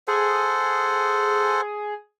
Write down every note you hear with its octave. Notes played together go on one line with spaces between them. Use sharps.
G#4 A4 C5 F#5